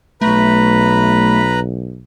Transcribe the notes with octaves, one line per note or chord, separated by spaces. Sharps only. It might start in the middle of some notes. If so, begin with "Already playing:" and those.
B1 A3 B4 A#5 B5